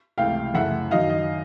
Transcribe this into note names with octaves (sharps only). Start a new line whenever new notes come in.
C#2 C3 E3 A3 F5 G5
F#2 C#3 E3 A3 E5 F#5
F#2 D#3 F#3 D#5 F5
D#5